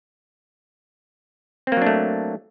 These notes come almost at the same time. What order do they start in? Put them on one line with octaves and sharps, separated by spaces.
C4 A#3 F#3 D4 A3